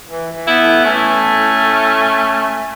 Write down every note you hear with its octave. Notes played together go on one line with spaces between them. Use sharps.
E3
E3
B3 E4
A2
E3 A3 C#4
A2
A2
A2